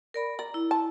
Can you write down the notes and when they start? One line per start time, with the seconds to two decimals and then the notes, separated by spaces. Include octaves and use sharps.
0.14 A#4 D5 B5
0.39 D5 A#5
0.54 E4
0.71 A5